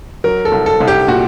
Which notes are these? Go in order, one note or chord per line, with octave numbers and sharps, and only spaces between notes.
F#3 A#4
A4
C2
A4
C2
G4
A#2 F#4